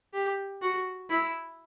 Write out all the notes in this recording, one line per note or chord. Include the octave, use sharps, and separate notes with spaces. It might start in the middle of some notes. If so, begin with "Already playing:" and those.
G4
F#4
E4